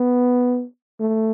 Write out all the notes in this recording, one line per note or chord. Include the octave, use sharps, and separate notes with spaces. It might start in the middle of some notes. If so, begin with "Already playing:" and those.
Already playing: B3
A3